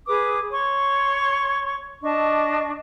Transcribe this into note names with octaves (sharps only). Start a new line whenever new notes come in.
G#4 B4 D6 D#6
C#5 C6 C#6
D4 D#5 A5 C#6